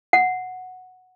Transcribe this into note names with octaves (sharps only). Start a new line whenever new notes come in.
F#5